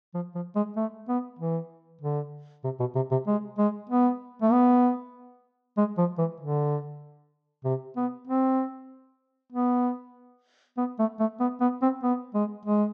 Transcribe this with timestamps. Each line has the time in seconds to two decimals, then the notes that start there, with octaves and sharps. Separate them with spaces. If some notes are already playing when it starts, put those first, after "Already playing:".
0.14 F3
0.35 F3
0.55 G#3
0.76 A3
1.08 B3
1.39 E3
2.01 D3
2.64 C3
2.80 B2
2.96 C3
3.11 C3
3.27 G#3
3.58 G#3
3.89 B3
4.42 A3
4.52 B3
5.78 G#3
5.98 F3
6.18 E3
6.40 D3
7.64 C3
7.96 B3
8.27 C4
9.52 B3
10.78 B3
10.99 A3
11.20 A3
11.40 B3
11.61 B3
11.82 C4
12.03 B3
12.34 G#3
12.65 G#3